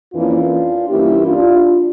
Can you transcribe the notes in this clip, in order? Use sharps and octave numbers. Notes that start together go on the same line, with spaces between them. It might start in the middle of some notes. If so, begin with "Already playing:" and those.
F2 E3 A#3 C#4 D4 F4
G2 E3 A#3 C#4 E4 G4
D4 F4